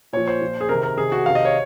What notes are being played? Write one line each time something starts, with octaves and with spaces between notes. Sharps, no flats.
A#2 F3 C#5
C5
A#2 F3
G#4
C3 D#3 A#4
A#4
C3 D#3 G#4
F#4
C3 D#3 F5
D#5
C#5